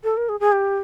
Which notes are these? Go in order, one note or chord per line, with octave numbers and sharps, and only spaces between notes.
A4
A#4
G#4
G#4
G4